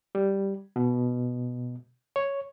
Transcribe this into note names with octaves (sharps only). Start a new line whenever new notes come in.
G3
B2
C#5